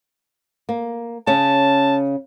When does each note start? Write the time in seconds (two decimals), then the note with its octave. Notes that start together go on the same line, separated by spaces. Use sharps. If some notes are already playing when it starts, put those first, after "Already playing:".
0.69 A#3
1.27 C#3 C#4 A5